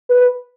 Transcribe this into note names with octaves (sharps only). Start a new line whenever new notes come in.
B4